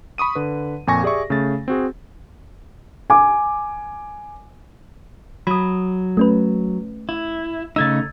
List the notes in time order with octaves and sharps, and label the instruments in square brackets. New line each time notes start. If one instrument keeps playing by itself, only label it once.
[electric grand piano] B5 C#6 D#6 D#7
D3 B4
F2 A#2 G#5 C#6 A#6
G4 G#4 D5 E5 C#6
C#3 A3 A6
C4 F#4 G#4
[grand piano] G#5 D6
[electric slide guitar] F#3 [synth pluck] B5 D#6
[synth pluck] A3 C#4 B4
[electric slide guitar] E4
[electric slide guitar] C#3 A3 D#4 [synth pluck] E6 G#6 A6